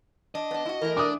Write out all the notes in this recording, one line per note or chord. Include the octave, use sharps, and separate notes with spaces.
D4 D#5
B3 D4
E4 F#4
E3 A3 A#4
D4 D6 D#6